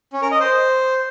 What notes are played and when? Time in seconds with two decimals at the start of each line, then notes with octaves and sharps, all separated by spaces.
0.13 C#4
0.22 A#4
0.31 D#5
0.40 C5